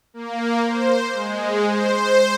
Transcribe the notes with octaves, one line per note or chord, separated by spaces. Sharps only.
A#3
C5
G#3
C5